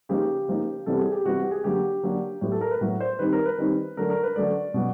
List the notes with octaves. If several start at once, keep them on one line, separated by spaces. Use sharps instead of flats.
C#3 F3 A#3 D#4 G4
C#3 F3 A#3 D#4
C3 E3 G3 B3 A4
G#4
G4
C3 E3 G3 B3 F#4
G4
G#4
D3 F#3 A#3 D4 G4
D3 F#3 A#3 D4
A2 F#3 B3 G4
A4
A#4
B4
A2 F#3 B3
C5
D#3 G3 C4 D#4 B4
A#4
B4
D#3 G3 C4 D#4
D3 F#3 A3 D4 A#4
A#4
B4
D3 F#3 A3 D4 D5
B2 F#3 B3